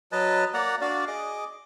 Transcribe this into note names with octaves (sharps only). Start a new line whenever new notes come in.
F#3 B4 D#5 A5
A#3 D5 F#5 A#5
D4 F#4 D5 F5
G#4 D#5 D6